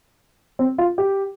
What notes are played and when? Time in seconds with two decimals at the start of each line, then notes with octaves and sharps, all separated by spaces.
0.59 C4
0.78 F4
0.98 G4